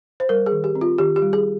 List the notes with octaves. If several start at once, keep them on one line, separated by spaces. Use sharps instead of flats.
C5
G3 A#4
G#4
D#3
G4
C4
F4
D#3 G4
G4
G3
G#4